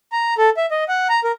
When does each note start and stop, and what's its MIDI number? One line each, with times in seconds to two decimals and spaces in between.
0.12 0.34 82
0.38 0.50 69
0.57 0.66 76
0.71 0.84 75
0.88 1.08 78
1.09 1.20 82
1.24 1.32 70